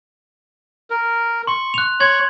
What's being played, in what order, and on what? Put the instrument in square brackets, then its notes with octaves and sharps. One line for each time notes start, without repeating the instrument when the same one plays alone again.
[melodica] A#4
[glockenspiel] C6 [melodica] C#6
[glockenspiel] F#6 F7
[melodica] C#5 C#6 [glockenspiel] C6 G#6 F#7